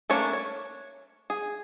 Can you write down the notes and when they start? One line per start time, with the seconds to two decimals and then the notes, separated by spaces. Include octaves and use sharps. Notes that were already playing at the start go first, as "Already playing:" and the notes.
0.10 A3 A#3 C#4 D4 C#5
0.33 C#5
1.30 G#4